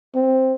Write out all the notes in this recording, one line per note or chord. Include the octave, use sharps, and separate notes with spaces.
C4